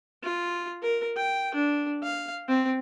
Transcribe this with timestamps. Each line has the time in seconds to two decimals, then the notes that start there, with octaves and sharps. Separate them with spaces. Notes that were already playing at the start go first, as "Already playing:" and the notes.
0.23 F4
0.82 A#4
1.16 G5
1.54 D4
2.03 F5
2.48 C4